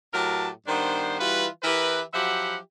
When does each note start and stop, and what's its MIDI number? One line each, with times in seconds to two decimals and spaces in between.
0.14 0.48 45
0.14 0.48 54
0.14 0.48 67
0.14 0.48 70
0.14 0.48 81
0.67 1.16 43
0.67 1.16 51
0.67 1.16 59
0.67 1.16 62
0.67 1.16 72
1.20 1.47 52
1.20 1.47 55
1.20 1.47 65
1.20 1.47 66
1.20 1.47 71
1.63 2.02 52
1.63 2.02 64
1.63 2.02 67
1.63 2.02 70
1.63 2.02 71
2.14 2.56 53
2.14 2.56 54
2.14 2.56 67
2.14 2.56 76
2.14 2.56 78
2.14 2.56 83